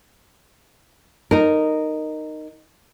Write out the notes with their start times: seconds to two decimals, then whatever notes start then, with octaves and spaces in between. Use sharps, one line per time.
1.31 D#4 A#4